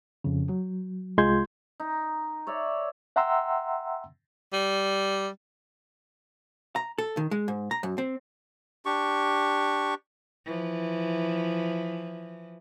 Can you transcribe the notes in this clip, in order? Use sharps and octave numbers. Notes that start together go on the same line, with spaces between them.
F2 C#3
F#3
C2 G#3 F4 C6 G6 G#6
D#4
C#5 D5 E5
E5 F#5 G5 A#5 C6 E6
G3
A#5
A4
D#3
G#3
G#2
A#5
F#2
C4
D4 G4 C#6
E3 F3